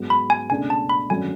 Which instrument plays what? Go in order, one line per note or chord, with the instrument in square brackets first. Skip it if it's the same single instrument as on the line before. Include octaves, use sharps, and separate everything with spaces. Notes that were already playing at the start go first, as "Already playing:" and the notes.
Already playing: [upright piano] G#2 F#3 B3
[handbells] B5
G#5
[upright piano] C#2 B2 A3 D4 [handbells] G#5
[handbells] A5
B5
[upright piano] G#1 F#2 D3 F#3 A3 [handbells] G#5